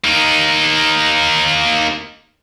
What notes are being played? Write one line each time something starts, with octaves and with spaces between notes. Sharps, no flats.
A#3 D#4